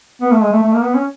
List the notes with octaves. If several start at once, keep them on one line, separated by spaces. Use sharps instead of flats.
B3
A3
G#3
A3
A3
A#3
B3
C#4